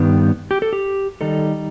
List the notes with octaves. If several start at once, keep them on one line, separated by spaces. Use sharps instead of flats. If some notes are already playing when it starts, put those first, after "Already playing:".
Already playing: G2 D#3 G3 B3
G4
A4
G4
D#3 G3 D#4 A4